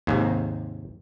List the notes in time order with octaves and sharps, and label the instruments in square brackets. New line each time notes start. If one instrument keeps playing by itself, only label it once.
[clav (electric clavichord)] D#2 G#2 C3